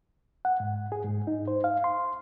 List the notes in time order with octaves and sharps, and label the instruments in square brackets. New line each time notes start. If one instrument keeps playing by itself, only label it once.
[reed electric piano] F#5
G#2
G#4
G#2
D#4
C5
F5
C6